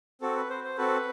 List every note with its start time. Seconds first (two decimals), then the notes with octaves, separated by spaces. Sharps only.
0.21 C4 F#4 A4
0.36 B4
0.50 C5
0.64 C5
0.77 C4 F#4 A4 B4